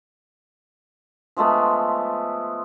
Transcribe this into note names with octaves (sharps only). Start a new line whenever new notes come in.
F3 G#3 A3 B3